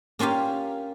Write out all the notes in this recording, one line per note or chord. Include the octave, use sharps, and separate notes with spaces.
A#3 C#4 F4 G4 F5